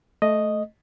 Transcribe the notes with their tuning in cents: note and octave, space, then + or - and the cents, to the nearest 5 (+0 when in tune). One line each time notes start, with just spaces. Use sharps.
A3 -10 D#5 +0